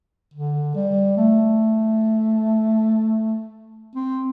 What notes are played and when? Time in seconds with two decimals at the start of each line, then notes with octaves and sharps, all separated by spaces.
0.34 D3
0.75 G3
1.17 A3
3.95 C4